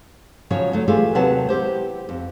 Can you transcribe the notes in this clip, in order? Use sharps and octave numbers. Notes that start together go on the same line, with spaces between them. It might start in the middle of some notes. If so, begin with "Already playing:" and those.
C#3 F3 F#3 C#4 C#5
D3 F#3 A3
E3 A3 F4 G4 G#4
D#2 C3 F#3 B4 F#5 A5
B3 E4 G4 C5
F2